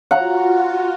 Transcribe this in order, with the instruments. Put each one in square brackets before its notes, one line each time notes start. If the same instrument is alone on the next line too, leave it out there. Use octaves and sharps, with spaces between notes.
[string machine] F4 F#4 [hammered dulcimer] F#5 A#5